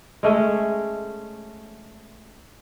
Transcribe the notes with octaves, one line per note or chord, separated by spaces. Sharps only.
G#3 A3 C#4